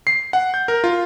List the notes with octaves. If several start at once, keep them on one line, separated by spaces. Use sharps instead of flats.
C7
F#5
G6
A#4
F4